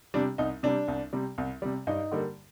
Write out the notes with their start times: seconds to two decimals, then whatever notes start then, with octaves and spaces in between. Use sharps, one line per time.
0.14 C3 G3 D4
0.38 C2 D#4
0.63 C3 G3 D4
0.88 C2
1.13 C3 G3
1.38 C2
1.62 C3 G3
1.87 G2 D#4
2.12 D3 G3 A#3